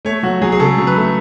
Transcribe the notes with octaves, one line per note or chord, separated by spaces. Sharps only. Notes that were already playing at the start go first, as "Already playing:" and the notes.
A3 C#5
F#3 F#4
F#3 G#4
G#4
C#3 A4
F#3
B4
A3